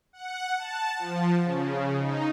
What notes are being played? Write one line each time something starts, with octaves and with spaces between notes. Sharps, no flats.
F#5
A5
F3
C#3
D#4